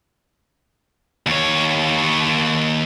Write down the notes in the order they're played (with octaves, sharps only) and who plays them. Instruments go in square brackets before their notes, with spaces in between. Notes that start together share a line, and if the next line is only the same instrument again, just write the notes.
[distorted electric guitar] D#2 C#5